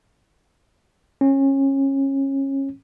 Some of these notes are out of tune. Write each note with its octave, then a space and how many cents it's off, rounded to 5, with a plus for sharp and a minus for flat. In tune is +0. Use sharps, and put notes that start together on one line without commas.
C#4 -25